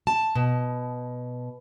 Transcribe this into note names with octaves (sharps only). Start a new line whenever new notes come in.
A5
B2